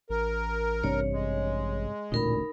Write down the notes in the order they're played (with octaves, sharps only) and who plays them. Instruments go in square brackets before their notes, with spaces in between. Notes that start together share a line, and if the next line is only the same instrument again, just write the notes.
[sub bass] A1 [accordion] A#4
[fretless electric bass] G2 C3 D4 [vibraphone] C#5
[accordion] G#3
[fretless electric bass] E1 A1 D2 [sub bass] A#2 [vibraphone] D#4 A#4 B5